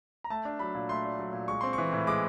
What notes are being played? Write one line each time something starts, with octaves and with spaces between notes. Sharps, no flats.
A#5
A3 A5
D4
F#3 B5
A#2
A3 C6
D4
F#3
A#2
G#3 C#6
C4 C6
E3 C#6
A2
G#3 D6